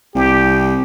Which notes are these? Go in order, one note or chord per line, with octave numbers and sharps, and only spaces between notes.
C2 G4